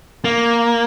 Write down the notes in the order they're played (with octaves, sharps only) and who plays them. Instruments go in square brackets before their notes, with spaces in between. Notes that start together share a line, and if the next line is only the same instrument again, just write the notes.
[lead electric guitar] A#3